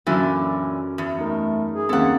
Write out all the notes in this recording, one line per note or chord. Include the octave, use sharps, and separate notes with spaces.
F#2 A#2 D3 E3 C#4
E2
A3 D#4 A#4
G#4
D#2 C4 C#4 A4 F#5